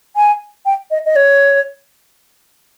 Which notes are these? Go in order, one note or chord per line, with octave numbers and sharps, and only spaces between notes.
G#5
G5
D#5
D#5
C#5